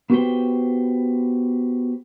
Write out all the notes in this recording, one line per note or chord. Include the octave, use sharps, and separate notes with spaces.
B3 F#4 G4 B4 C5 G5